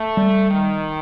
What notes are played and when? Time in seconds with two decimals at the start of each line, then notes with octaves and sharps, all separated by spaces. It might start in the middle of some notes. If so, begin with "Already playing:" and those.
Already playing: A3
0.17 G3
0.50 D#3